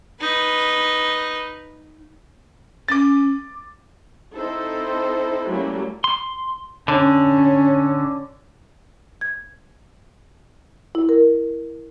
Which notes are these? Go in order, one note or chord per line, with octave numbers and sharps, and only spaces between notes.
D#4 B4
C#4 D6 A6
C4 D#4 E4 A4 C5
F#3 G3 A3 A#3 C#4 E4
C6
D3 C#4
G#6
E4
A#4